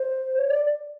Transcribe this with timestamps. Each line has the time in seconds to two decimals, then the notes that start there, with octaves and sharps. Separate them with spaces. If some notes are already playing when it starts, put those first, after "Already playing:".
Already playing: C5
0.37 C#5
0.48 D5